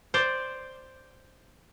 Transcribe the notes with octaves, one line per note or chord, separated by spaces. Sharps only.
C5 D5